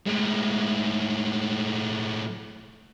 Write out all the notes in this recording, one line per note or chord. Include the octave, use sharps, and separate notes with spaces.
A2 G#3